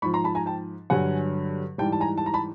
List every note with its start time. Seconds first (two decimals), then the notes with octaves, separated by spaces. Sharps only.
0.02 G#2 F3 B5 C#6
0.14 A#5 C6
0.24 A5 B5
0.35 G#5 A#5
0.46 G5 A5
0.90 G2 D3 F#3 F#5 G#5
1.78 G#2 E3 G3 G5 A5
1.92 A5
2.00 G#5 A#5
2.17 A5
2.26 A#5
2.34 A5 B5